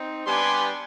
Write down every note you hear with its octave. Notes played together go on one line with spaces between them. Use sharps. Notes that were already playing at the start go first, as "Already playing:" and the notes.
Already playing: C4 D#4
G3 B3 D4 G4 G#5 C6